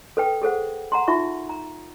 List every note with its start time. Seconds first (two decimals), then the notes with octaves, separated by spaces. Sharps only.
0.17 A4 B4 G5
0.42 G#4 A4 C5 F#5
0.92 F#5 A#5 C6
1.08 D#4 F4 E5 C#6
1.49 A#5